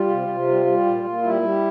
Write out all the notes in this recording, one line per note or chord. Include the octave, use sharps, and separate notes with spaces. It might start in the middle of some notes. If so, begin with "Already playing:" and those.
Already playing: G3 F4
C3
C3
G3
G3
A#2
A#2
G3 E4
G3